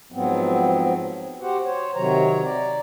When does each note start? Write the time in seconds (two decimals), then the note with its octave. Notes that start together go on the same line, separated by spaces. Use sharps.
0.12 G#2 F3 F#3 B3 C4
1.41 F#4 G4 C5 F#5
1.64 C5 C#5
1.96 C3 D#3 F#3 C#5 A#5
2.44 D5 A#5